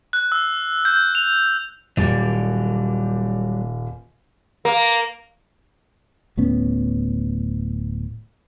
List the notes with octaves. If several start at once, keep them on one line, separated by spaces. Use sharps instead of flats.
F#6
E6
G6
F7
D#1 F#3 G3 A#3 A6
A#3
D1 A2 B3 C#4